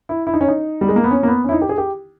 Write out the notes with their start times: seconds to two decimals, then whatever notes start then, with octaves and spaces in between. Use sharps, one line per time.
0.09 E4
0.27 E4
0.34 D#4
0.41 C#4
0.48 D#4
0.81 G3
0.89 G#3
0.96 A#3
1.04 B3
1.11 C#4
1.23 A#3
1.28 B3
1.44 C#4
1.49 E4
1.52 D#4
1.61 G4
1.69 G#4
1.78 G4